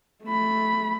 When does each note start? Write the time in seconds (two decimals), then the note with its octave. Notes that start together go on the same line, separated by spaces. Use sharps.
0.24 A3 B5